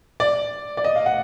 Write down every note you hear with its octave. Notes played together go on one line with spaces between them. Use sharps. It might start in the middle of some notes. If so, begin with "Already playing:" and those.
D5
D5
D#5
F5
F#5